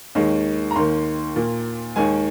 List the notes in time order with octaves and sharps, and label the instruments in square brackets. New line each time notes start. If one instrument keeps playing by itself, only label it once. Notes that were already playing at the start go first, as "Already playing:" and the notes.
[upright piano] D#2 D#3 G#3
A#5
D#2 D#3 A#3 C6
A#2 A#3
D#2 D#3 G#3 G#5